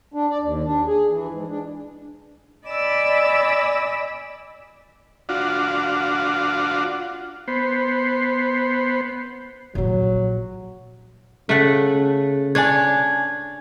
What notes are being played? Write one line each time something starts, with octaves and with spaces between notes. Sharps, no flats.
D4
D5
D#2
D4
G#4
E3
G#2
D4
D5 D#5 G#5 B5 D6 E6
D4 F4 F#4
B3 C5
A#1 A#2 F#3
C#3 A3 F#5
D4 C#5 G#5 G#6